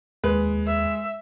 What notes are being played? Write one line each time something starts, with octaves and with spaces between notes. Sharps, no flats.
D#2 G#3 B4
E5